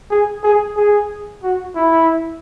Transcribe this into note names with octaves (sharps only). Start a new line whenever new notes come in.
G#4
G#4
G#4
F#4
E4